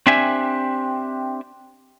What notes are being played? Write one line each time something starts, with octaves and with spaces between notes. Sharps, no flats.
C4 D4 G4 E5 G#5